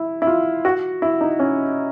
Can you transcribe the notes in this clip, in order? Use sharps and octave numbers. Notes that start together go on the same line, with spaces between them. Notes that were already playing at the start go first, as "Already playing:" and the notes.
Already playing: E4
E4
F4
F#4
E4
D#4
C#4